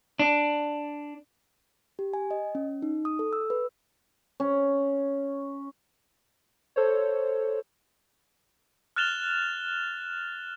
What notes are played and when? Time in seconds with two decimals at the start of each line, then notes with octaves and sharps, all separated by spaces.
0.19 D4
1.99 G4
2.13 G#5
2.31 D#5
2.55 C#4
2.82 D#4
3.05 D#6
3.19 A4
3.33 E6
3.50 B4
4.40 C#4
6.76 A4 C5 C#5
8.96 F6 F#6 A6 E7 F7 G7